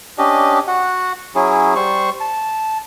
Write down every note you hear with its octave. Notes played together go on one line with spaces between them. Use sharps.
C#4 D4 G4 D#5
F#4 F#5
F#3 C#4 E4 G#4
G3 C5 C#6
A5